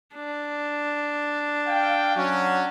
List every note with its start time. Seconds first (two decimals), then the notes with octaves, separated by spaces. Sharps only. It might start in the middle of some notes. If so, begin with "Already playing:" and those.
0.15 D4
1.67 F5 G5
2.16 F#3 C#4